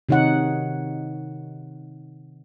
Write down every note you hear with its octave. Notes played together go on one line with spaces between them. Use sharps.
C3 D#3 D#4 C#5 F#5